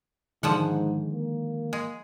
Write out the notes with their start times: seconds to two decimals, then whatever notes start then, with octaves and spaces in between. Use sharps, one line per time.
0.43 G#2 D3 D#3 F3 G#3 F#5
1.13 A#3
1.73 G#3